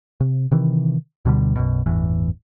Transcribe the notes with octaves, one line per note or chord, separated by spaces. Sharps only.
C3
C3 D#3 E3
D2 B2 D3 G3
B1 F#2 B2
G1 E2 A2 E3